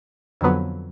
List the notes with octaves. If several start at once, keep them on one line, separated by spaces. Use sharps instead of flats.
F2 D3 F#3 B3